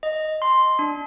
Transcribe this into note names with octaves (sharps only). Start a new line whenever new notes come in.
D#5
C6
D4